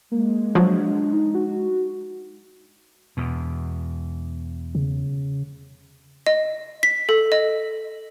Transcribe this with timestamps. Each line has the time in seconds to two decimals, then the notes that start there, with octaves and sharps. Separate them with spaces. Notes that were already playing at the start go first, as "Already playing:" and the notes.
0.12 G#3 A#3
0.55 F3 F#3 D4
1.13 D#4
1.35 F#4
3.17 E2 B2
4.75 C#3
6.27 D#5
6.83 B6
7.09 A4
7.32 D#5